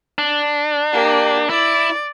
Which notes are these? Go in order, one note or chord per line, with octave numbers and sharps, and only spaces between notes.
D4
A#3 G4
E4 D5